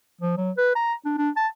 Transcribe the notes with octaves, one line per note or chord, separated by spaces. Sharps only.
F3
F#3
B4
A#5
D4
D4
A5